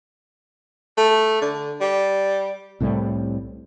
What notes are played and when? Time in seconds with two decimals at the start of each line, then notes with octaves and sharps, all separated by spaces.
0.97 A3
1.41 D3
1.81 G3
2.80 C2 A2 C3 G3